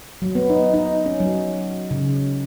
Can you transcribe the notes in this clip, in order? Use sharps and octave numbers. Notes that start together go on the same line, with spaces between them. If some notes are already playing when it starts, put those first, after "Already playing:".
F#3
B3
D#4
D#4
C#4
F#3
C#3